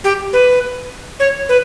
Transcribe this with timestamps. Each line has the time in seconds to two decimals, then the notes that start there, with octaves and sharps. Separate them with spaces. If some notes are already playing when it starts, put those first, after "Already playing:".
0.04 G4
0.33 B4
1.20 C#5
1.49 B4